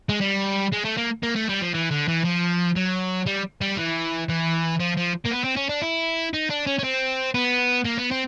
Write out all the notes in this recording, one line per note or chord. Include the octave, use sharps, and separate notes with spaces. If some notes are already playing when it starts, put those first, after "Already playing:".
G#3
G3
G#3
A3
A#3
A#3
A3
G3
F3
E3
D3
E3
F3
F#3
G3
G3
E3
E3
F3
F3
A#3
B3
C4
C#4
D4
E4
D#4
D4
C#4
C#4
C4
B3
A#3
B3
C4